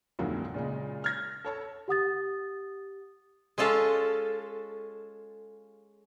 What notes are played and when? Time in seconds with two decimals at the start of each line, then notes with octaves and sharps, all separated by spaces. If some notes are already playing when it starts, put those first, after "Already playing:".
0.19 F1 D2 G#2 F#3 A#3 F4
0.54 A#2 C#3 G#3
1.04 F6 G#6 A#6
1.44 A4 C#5 A5
1.88 G4 F#5 D#6 A6
3.58 G#3 C#4 F4 A4